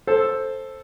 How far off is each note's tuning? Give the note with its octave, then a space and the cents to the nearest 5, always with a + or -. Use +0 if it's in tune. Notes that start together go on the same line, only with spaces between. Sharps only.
A4 +0 C5 +10